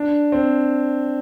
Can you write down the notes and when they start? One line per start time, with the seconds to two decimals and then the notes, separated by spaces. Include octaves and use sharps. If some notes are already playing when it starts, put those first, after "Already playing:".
Already playing: D4
0.32 C4